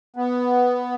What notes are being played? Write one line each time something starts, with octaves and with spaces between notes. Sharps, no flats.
B3